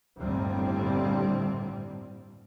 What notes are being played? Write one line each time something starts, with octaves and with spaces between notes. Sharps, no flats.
G1 D#2 A2 D3 G3 C4